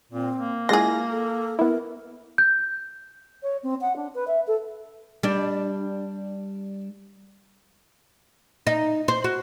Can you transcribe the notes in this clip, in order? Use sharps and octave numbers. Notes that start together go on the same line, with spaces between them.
A#2 C4
A#3
G#3 E4 F4 G#4 A#6
A4
B3 E4 A#4
G6
C#5
C4
F#5
D4
B4
E5
A4
G3 D4
D#4
C5
F#4